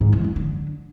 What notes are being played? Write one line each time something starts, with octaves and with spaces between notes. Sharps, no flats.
G#2
E3
F#2
D3